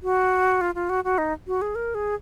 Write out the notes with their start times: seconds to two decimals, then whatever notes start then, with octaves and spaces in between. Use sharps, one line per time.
0.03 F#4
0.61 F4
0.75 F4
0.89 F#4
1.04 F#4
1.18 D#4
1.47 F#4
1.62 G#4
1.75 A#4
1.95 G#4